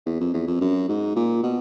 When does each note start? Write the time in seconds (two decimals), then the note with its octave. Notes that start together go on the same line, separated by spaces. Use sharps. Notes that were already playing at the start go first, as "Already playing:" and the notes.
0.06 E2
0.20 F2
0.33 E2
0.47 F2
0.61 F#2
0.88 G#2
1.16 A#2
1.43 B2